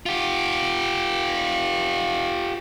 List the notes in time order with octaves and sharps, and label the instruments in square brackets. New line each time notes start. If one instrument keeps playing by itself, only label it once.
[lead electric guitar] F4 G4